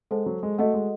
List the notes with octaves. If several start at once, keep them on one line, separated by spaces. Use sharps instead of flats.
G#3 A4 C5 F#5 A5
F#3
G#3
A3 F#4 A4 D#5 F#5
G#3